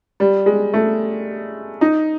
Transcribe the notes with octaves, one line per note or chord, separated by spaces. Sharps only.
G3
G#3
A3
D#4